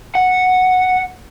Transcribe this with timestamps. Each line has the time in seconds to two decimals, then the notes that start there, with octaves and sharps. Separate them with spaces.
0.15 F#5